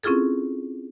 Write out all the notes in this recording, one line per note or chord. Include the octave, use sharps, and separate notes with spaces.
C4 C#4 E4 F4 G#4 A4